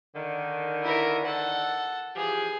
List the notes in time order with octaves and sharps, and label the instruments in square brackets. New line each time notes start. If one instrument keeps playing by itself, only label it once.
[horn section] D3 D#3
[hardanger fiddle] E4 A#4
A4 F#5
[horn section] E3 F3 G4 [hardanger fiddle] G#4